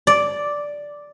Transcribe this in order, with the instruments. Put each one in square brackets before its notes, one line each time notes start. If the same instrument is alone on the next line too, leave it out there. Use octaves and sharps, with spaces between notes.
[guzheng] D5